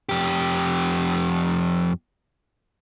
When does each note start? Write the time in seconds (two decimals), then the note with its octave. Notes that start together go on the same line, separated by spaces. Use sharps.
0.09 F2 G4